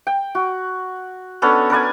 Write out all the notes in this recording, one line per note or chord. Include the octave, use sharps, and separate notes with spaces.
G5
F#4
B3 C#4 D4 A4
A#4 B4 D5 G#5